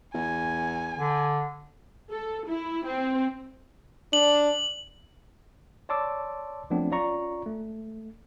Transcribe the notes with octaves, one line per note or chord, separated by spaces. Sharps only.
E2 G#5
D3
A4
E4
C4
D4 F#7
C#5 D5 A5 C6 D6 E6
F3 F#3 A3 B3 C4 D4
C#4 F4 D5 A#5 C#6
A3